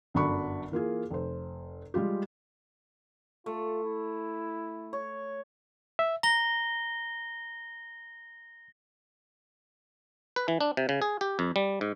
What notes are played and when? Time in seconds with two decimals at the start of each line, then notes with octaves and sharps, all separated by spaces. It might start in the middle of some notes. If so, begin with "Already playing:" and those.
0.14 G1 F#2 F#3 D4 B5 C#6
0.72 E3 A#3 F4 G#4
1.10 F1 C5
1.94 G3 G#3 F4 G4
3.46 A3 F4
3.83 E4
4.93 C#5
5.99 E5
6.23 A#5 A#6 G7
10.36 B4
10.48 E3
10.61 D4
10.77 C3
10.89 C#3
11.02 G#4
11.21 G4
11.39 F2
11.56 G3
11.81 G#2